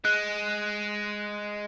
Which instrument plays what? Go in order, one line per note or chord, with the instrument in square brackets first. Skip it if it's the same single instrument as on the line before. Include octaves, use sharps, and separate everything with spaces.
[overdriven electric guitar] G#3 [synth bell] F#6